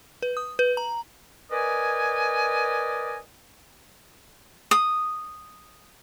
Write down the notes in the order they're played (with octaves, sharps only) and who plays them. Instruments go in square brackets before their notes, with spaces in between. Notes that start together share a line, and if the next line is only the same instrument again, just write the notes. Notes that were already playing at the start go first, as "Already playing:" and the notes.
[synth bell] B4
D#6
B4
A#5
[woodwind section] A#4 B4 D5 D#5 G#5
[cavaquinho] D#6